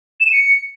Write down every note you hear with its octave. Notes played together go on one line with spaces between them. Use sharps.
E7
D#7
C#7